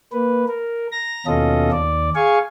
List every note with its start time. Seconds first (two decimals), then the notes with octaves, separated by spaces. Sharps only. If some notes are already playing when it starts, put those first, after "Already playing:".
0.12 A#3 B4
0.48 A#4
0.92 A#5 A#6
1.27 D#2 B2 C#4 F4 A4 D#5
1.72 D#2 D5
2.15 G#4 F5 G#5 C#6